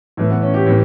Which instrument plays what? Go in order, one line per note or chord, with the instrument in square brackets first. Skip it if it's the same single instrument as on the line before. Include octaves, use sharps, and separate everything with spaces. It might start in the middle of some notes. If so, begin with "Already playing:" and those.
[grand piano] A2 E3 A3
B3
C#4
G4
A2 E3